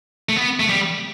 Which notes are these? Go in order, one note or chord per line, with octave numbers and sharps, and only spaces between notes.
A3
B3
A3
G3